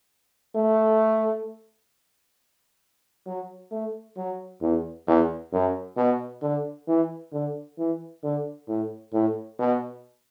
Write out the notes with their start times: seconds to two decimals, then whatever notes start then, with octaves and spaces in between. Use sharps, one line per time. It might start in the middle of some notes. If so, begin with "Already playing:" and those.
0.55 A3
3.26 F#3
3.71 A3
4.17 F#3
4.61 E2
5.07 E2
5.52 F#2
5.97 B2
6.42 D3
6.87 E3
7.32 D3
7.78 E3
8.23 D3
8.68 A2
9.13 A2
9.59 B2